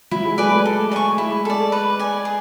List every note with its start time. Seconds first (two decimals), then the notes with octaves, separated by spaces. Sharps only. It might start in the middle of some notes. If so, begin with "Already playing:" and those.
0.11 F#3 E4
0.25 G#3
0.38 A3 B4 D5 G#5
0.51 A3
0.65 A4
0.91 D5 G#5 C#6
1.18 G#3 E4
1.45 A4 D5
1.72 B4
1.99 D5 G#5
2.25 G#4